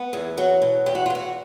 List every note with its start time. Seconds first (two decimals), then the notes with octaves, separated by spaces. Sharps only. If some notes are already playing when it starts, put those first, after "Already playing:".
Already playing: B3
0.13 E2 G#4
0.37 F#3 F#4
0.62 B2
0.86 E2 G4
0.95 F#4
1.06 F4
1.10 E2 F#4